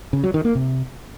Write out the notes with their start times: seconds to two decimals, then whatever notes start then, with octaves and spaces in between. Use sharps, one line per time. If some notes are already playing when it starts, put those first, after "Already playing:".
0.13 C#3
0.24 F#3
0.34 D#3
0.45 A#3
0.55 C3